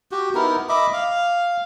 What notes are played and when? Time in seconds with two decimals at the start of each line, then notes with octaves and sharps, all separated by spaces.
0.11 F#4 G4
0.35 B3 D#4 E4 A#4
0.69 D#5 E5 B5 D6
0.93 F5